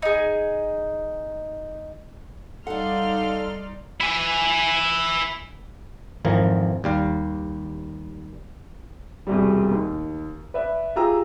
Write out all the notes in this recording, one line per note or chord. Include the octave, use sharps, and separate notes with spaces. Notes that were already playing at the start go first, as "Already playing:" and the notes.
D#4 G#4
G3 D#4 A4 D5 F5 F#5 C6 F6
E4 G#5
G#1 F2 E3 F3 A#4
D#2 G3 F5
E1 C2 G3
D#2
B4 D5 E5
F4 G4 G#4 A#5 E6